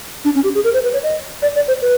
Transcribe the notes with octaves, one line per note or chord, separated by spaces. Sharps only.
D4
C#4
G4
G#4
A#4
C5
B4
C#5
D#5
D5
D5
C5
B4